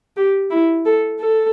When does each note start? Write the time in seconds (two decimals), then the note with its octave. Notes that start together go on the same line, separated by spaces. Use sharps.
0.17 G4
0.51 E4
0.86 A4
1.20 A4